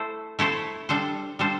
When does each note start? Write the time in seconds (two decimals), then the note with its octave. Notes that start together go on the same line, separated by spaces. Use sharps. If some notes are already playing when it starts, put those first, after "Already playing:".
Already playing: A3 E4 A4 C5
0.39 A3 E4 A4 C5
0.89 G3 D4 A4 C5
1.39 G3 D4 A4 C5